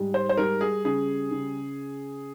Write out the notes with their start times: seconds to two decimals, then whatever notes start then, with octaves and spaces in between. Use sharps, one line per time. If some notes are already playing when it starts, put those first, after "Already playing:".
Already playing: G#2 G3
0.14 C5
0.29 C5
0.37 G3 A#4
0.61 G#4
0.84 C#3 G#4
1.31 C#3